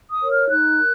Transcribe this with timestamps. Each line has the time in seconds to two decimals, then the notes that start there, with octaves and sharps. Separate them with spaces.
0.10 D#6
0.20 A#4 C#5
0.30 F6
0.49 D#4 F#6
0.79 A#4